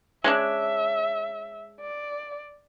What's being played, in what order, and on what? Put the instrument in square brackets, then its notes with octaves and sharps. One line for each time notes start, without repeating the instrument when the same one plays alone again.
[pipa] G#3 C#4 D4 [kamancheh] E5
[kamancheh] D5